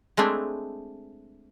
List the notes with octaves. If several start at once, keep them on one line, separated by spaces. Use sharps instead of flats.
G#3 A3 C4 D4 E4